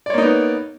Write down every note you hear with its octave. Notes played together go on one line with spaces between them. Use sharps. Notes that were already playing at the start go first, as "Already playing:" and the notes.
A#3 B3 D#4 C#5 D5